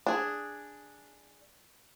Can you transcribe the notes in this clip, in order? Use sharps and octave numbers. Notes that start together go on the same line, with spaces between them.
D4 G#4